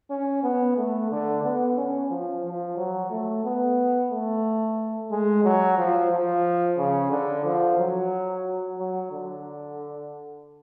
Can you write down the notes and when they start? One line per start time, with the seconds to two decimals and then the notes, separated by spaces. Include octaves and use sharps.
0.10 C#4
0.43 B3
0.77 A3
1.11 D3
1.44 B3
1.77 C#4
2.10 F3
2.44 F3
2.77 F#3
3.10 A3
3.45 B3
4.10 A3
5.11 G#3
5.44 F#3
5.77 F3
6.11 F3
6.78 C#3
7.11 D3
7.45 F3
7.78 F#3
8.78 F#3
9.11 D3